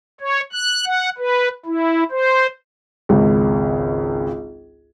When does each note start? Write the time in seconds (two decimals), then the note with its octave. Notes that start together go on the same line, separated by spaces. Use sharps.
0.20 C#5
0.53 F#6
0.86 F#5
1.18 B4
1.65 E4
2.11 C5
3.09 G#1 C#2